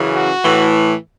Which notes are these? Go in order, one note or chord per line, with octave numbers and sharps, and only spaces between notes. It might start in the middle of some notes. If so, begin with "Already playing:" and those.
Already playing: F#2 C#3 E3
F#4
A2 E3